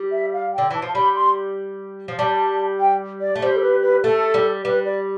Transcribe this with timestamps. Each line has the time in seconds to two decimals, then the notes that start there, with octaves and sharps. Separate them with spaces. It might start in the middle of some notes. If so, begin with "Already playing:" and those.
Already playing: G3
0.12 E5
0.33 F5
0.54 D3 G5
0.70 E3 A5
0.82 F3
0.95 G3 B5
1.16 C6
2.08 F3
2.18 G3 A5
2.80 G5
3.21 D5
3.35 A3
3.42 G3 C5
3.57 A4
3.62 B4
3.82 B4
4.03 A3 A4
4.34 G3
4.65 G3 B4
4.86 D5